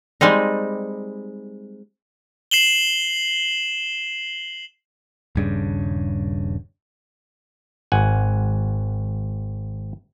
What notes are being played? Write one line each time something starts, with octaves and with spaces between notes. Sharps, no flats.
G3 G#3 C4 D#4
C7 E7 F#7 G7
D#1 G2 C#3
G#1 F#5 G#5